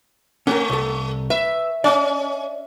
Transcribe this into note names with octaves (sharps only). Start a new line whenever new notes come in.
A3 C#4 A#4
C2 A4
B4 E5
C#4 D5 D#5